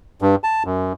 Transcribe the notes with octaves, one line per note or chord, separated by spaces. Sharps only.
G2
A5
F#2